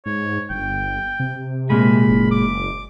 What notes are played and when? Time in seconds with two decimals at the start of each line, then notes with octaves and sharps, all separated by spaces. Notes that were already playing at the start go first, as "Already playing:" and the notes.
0.06 G#2 C#5
0.50 G1 G5
1.20 C3
1.70 A#2 G#3 B5
2.09 F#1
2.31 D6